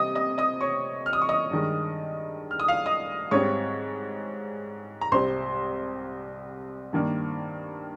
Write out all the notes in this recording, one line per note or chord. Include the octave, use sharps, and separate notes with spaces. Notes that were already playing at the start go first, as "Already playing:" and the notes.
Already playing: C3 G3 C4 D#5 D#6
D#5 D#6
D#5 D#6
C#5 C#6
F6
D#6
C#6
D#5 D#6
G2 D#3 G#3
F6
D#6
F5 F6
D#5 D#6
G#2 G3 C4 C#5 C#6
A#5
C2 C3 G3 C5 C6
G2 D#3 A#3